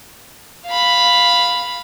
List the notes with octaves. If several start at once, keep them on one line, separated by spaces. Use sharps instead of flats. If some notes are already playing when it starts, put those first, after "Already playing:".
F5 B5